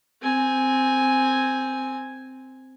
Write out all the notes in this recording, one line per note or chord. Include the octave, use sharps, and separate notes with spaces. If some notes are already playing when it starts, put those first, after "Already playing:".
C4 G#5